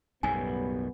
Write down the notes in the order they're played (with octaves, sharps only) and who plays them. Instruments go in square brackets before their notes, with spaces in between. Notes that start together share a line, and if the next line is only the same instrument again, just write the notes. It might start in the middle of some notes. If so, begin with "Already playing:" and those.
[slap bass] B1 F#2 A2 [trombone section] F#3 G3 B3 [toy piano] G#5